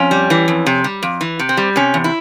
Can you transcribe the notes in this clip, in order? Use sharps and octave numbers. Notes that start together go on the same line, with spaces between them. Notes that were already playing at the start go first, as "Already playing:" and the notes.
Already playing: F2 C#4
G3
E3
F2
C3
G3
F2
E3
C3
C4
G3
C3 C#4
E2
E4